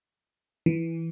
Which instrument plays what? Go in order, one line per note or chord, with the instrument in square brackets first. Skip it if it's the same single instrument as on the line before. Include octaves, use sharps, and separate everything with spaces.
[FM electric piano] E3